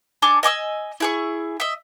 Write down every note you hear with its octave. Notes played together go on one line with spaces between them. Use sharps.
D4 A4 G#5 D6
D#5 G#5 D6 E6
E4 G#4 C#6
D#5 E5